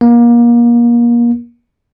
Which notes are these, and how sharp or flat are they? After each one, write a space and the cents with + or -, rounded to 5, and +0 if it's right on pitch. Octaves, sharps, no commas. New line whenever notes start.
A#3 +30